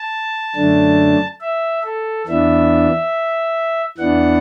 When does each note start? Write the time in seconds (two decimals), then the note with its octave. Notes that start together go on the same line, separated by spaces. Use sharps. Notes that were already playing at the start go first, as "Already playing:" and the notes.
Already playing: A5
0.55 F#2 D3 A3 D4
1.41 E5
1.84 A4
2.26 E2 E3 B3 D4 E5
3.98 E2 E3 B3 D4 F#5